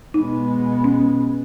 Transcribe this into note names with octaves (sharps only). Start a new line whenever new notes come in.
B2 G#3 B3 D#4
C#4